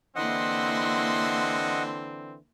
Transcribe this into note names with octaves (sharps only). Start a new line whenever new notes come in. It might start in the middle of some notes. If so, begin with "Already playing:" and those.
D3 E3 A#3 C4 E4 D#5 F#5 C6